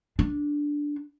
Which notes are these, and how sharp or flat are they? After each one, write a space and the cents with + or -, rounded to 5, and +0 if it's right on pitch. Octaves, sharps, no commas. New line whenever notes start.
D4 -5